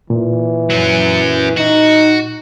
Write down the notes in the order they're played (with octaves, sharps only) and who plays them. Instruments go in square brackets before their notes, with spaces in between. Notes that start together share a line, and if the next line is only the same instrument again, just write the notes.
[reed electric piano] A#2 [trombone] E3
[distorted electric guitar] F#3 C#4
[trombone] D#4 [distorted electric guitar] F#4